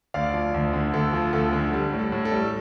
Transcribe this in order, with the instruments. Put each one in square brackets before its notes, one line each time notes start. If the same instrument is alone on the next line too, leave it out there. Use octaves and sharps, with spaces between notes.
[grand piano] D2 D5 F5
F3
D2
D3
D2 A4
F3
D2 A4
D3
G3
A2
A4
A2
A4
G3